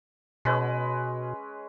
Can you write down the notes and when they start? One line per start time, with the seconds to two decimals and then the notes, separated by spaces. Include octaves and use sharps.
0.45 B2 G#3 C#4 B4